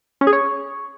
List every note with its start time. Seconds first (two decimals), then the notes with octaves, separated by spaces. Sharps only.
0.21 C#4
0.27 G#4
0.33 C#5